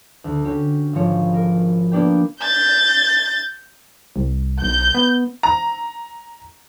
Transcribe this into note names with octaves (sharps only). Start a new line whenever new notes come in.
D2
C#4 F#4 G4
G#1 F3 C#5
A#4
A#3 B3 D4 G4 G5
G6 A6
C2
B1 G6
B3
A#5